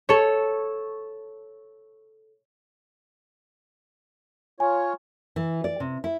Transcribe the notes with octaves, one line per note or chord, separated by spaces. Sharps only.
A4 C#5
F4 C#5 G#5
E3
D5
C3
E4